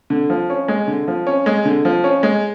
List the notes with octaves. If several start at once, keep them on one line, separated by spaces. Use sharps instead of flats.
D3
F3
C#4
G#3
D3
F3
C#4
G#3
D3
F3
C#4
G#3